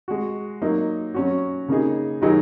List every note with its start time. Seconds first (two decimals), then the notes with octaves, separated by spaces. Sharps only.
0.08 G#3 F#4
0.62 F#3 A#3 D#4
1.14 F#3 C#4 F#4
1.68 C#3 A#3 D#4 G#4
2.22 D#3 F#3 D#4 G#4